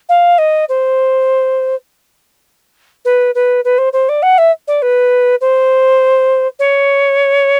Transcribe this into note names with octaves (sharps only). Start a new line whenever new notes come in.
F5
D#5
C5
B4
B4
B4
C5
C5
D5
F#5
E5
D5
B4
C5
C#5